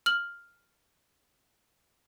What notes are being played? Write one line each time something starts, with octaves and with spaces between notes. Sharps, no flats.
F6 F#7